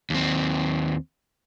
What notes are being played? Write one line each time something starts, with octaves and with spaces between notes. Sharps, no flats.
D#2 C4